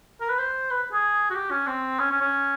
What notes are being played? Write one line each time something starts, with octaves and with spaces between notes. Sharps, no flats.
A#4
B4
C5
B4
G#4
F#4
G4
C#4
C4
C#4
C#4
C#4